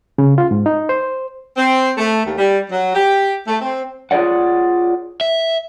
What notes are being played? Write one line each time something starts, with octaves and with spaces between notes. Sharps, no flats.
C#3
F4
G#2
D#4
C5
C4
A3
D#2
G3
F#3
G4
A3
C4
F4 G#4 C#5 D5 F#5
E5